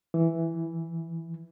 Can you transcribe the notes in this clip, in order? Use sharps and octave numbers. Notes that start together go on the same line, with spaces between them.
E3